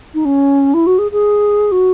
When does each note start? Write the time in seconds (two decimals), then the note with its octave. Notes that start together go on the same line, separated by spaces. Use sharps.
0.14 D#4
0.25 C#4
0.74 E4
0.86 F#4
0.98 G#4
1.12 G#4
1.71 F#4